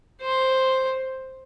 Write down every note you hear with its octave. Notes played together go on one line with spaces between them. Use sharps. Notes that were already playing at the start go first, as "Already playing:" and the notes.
C5